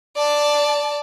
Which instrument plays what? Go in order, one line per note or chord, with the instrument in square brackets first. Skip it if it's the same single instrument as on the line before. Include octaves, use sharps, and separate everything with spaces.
[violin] D5 A5